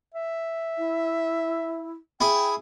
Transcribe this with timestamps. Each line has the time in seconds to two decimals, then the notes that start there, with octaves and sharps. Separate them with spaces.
0.14 E5
0.78 E4
2.21 E4 G#4 G5